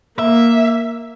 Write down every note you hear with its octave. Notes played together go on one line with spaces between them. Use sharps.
A#3 E5